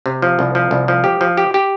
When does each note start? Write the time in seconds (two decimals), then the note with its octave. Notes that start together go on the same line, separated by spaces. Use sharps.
0.06 C3
0.22 F3
0.39 C2
0.55 F3
0.71 C2
0.88 F3
1.04 G4
1.21 F3
1.37 G4
1.54 G4